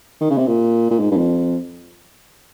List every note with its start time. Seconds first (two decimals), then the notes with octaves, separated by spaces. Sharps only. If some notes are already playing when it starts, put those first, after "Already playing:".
0.21 D#3
0.30 C#3
0.38 C3
0.47 A#2
0.91 A#2
0.99 G#2
1.11 G2
1.17 F2